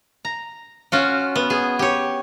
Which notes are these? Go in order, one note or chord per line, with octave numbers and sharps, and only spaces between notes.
A#5
C#4 F4 F#4
B3
G#4
G4 C#5